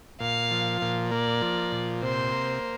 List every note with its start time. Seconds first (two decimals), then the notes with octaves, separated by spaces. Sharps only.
0.20 A#2 F5
0.51 F3
0.82 A#2
1.11 A#3 D5
1.42 F3
1.72 A#2
2.02 C3 C5
2.32 A#3